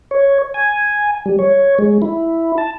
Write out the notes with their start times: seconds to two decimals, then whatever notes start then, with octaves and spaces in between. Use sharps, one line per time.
0.11 C#5
0.54 G#5
1.26 G3
1.39 C#5
1.79 G#3
2.02 E4
2.58 A5